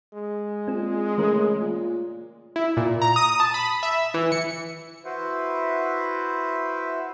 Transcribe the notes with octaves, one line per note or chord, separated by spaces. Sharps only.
G#3
A#2 C4 G#4
C#3 E3 A3 A#4
A#2
E4
A#2
A#5
D#6
A5
B5
E5
E3
C#7
E4 F#4 B4 C5 E5